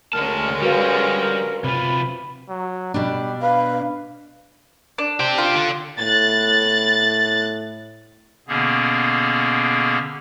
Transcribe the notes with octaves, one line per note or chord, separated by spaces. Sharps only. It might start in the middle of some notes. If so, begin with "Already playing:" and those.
D2 D3 G#3 C#4 A#4 A5 F6
G3 F#4 A#4 B4 F5
C3 F4 B5
F#3
B2 G3 D4
B4 F5
D4
G4 C5
F4
D3
A2 F#6 A6
B2 D3 A#3 B3 C#4 G#4